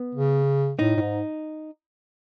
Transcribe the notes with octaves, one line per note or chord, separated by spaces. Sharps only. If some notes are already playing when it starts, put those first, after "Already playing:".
Already playing: B3
C#3
A2 D#4
A2
G#2